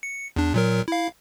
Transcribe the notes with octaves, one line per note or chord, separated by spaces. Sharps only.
C#7
E2 D4
A#2 F#3 A#4
E4 F5